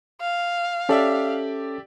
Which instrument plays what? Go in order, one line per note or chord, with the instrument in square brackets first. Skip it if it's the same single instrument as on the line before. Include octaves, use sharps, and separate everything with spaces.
[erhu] F5
[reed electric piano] C#4 A4 [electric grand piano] G4 D5 E5